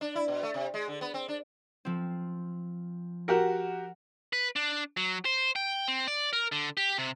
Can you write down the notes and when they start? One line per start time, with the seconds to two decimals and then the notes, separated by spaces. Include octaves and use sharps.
0.01 D4
0.15 E4
0.28 B2
0.43 A3
0.54 C3
0.74 G#3
0.88 D3
1.01 B3
1.14 C4
1.28 D4
1.85 F3 C4
3.28 F#4 G4 A#4 F#5
4.33 B4
4.56 D4
4.97 F#3
5.25 C5
5.56 G5
5.88 C4
6.08 D5
6.33 A#4
6.52 D3
6.77 G4
6.98 C3